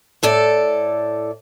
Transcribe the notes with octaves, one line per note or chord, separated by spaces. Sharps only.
A2 A4 D5